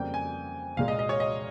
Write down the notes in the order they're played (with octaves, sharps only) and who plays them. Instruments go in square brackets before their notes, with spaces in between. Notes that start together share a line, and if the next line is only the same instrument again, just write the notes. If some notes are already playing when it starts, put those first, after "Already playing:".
Already playing: [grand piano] F2 C#3 G3 A#3 G5
G#5
C2 A#2 G#3 F5
D#5
D#5
C#5
D#5